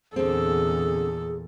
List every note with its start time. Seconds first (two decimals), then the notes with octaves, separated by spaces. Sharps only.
0.16 E2 A#2 D3 C4 G#4 A4